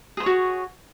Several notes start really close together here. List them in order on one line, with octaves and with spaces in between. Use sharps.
G#4 C5 C#5 F#4